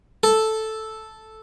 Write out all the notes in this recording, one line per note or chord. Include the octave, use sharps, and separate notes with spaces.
A4